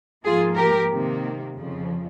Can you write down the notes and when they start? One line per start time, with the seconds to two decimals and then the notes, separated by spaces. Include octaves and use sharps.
0.25 G#2 F3 A#3 F4 G#4
0.57 G4 A#4
0.90 C3 D#3 A#3
1.54 F2 C#3 F3